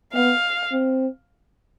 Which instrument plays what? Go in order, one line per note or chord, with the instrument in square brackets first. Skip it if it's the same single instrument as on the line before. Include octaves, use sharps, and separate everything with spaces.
[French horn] B3 [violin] F5
[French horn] C4